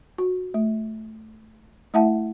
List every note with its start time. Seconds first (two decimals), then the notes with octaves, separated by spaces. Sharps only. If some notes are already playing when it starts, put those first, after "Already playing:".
0.18 F#4
0.54 A3
1.94 A3 E4 E5 F#5 A5